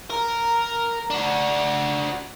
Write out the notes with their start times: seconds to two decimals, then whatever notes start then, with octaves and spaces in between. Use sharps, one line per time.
0.10 A#4
1.10 D4 F#4